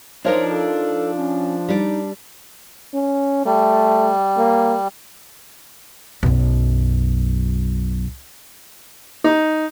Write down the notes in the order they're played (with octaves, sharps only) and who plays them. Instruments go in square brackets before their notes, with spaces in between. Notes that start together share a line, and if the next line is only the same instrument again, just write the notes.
[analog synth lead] F3 [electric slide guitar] D4 [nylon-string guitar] D#4 A#4 C#5
[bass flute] A4
C#4
[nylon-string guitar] G3 D5 [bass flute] D#4
[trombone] C#4
[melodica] G3 [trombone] A3
[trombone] A#3
[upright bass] B1 F#2
[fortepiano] D#4